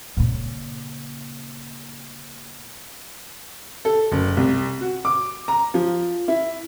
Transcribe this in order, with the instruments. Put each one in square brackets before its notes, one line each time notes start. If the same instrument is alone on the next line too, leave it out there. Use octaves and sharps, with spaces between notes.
[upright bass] A#2 C#3
[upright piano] A4
F#1
C2
F#4
D6
A#5
F3
E4